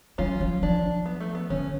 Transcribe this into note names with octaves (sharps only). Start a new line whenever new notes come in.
F#3 C#4 F4
F3
F3 D4
B3
A3
B3
D3 C#4